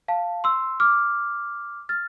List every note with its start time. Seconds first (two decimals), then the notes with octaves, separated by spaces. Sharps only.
0.08 F5 A5
0.44 C6 E6
0.80 D6 F6
1.89 F6 A6